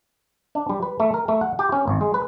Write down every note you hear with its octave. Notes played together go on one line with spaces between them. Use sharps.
D4
G3
B4
A3
A#4
A3
F#5
G4
C#4
G#1
G#3
B4